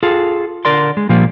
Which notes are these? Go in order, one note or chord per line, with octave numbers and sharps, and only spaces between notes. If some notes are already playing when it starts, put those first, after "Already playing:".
F4 G#4 A4
D3 A#4 D5 C6
G#3
A#2 F3 G3 A#3